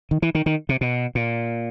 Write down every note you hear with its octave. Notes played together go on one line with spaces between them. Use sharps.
D#3
E3
D#3
D#3
C3
B2
A#2